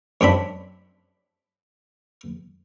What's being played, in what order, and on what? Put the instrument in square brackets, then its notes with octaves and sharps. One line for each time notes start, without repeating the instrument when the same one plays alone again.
[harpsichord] F#2 C4 D4 B5